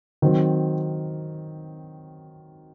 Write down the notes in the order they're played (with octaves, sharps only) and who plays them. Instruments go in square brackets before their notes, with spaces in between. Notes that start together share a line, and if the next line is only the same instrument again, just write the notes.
[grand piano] D#3 F#3 C4